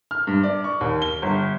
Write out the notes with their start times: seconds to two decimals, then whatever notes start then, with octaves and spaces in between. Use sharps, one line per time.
0.11 F6
0.27 G2
0.43 D5
0.64 C#6
0.81 D#2
1.02 G7
1.22 G1